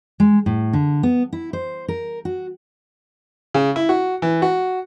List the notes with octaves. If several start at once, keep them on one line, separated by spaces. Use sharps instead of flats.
G#3
A2
D3
B3
E4
C5
A#4
F#4
C#3
E4
F#4
E3
F#4